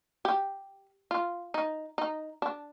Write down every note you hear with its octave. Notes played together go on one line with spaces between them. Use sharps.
G4
F4
D#4
D#4
D4